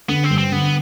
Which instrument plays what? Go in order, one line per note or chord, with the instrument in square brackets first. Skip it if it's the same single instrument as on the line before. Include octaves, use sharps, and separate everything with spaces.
[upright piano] D3 [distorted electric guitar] B3
[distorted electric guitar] C4
[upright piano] G2
[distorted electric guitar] C4
[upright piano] D3 [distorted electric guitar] B3